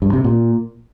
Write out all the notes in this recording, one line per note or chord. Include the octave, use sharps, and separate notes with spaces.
G2
C3
A#2